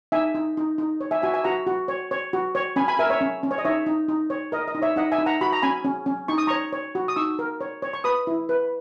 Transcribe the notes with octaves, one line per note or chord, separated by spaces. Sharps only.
D#4 E5 G#5
D#4
D#4
D#4
C#5
E5 G#5
F#4 E5 G#5
E5 G#5
F#4 F#5 A#5
F#4
C#5
C#5
F#4
C#5
C#4 G#5 B5
G#5 B5
A#4 E5 G#5
C#5 E5
C#4
C#4
C#5
D#5
D#4 C#5 E5
D#4
D#4
C#5
A#4 D#5
D#5
D#4
C#5 E5
D#4 D#5 F#5
E5 G#5
D#4
F#5 A#5
F#4 B5
A#5
C#4 G#5 B5
C#4
C#4
D#4 C#6
D#6
C#5 A#5 C#6
C#5
F#4
D#6
D#4 C#6 E6
A#4
C#5
C#5
C#6
B4 B5 D#6
E4
B4